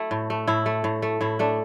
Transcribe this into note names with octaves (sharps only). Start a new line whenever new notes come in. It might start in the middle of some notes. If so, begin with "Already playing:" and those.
Already playing: A3 E4
A2
A3
A2 E4
A3
A2
A3
A2 E4
A3 D4